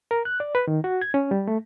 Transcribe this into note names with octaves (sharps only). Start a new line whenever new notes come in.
A#4
F#6
D5
B4
D#3
F#4
G#6
C#4
G3
A3